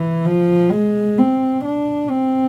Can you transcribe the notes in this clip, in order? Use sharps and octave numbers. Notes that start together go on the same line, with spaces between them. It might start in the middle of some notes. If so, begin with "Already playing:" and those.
Already playing: E3
F3
G#3
C4
D4
C4